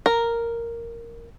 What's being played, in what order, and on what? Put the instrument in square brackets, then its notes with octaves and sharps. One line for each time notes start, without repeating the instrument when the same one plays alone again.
[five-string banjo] A#4